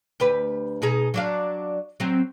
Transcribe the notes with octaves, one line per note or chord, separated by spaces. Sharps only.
D2 G4 B4
B2 D#4 G#4
F#3 D4 F5
F#3 C4